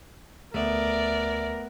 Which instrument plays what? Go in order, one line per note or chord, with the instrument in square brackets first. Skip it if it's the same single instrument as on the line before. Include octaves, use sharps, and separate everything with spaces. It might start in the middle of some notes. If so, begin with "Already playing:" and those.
[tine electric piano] D2 [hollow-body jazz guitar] A3 B3 [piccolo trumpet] A#4 [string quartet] D5 E5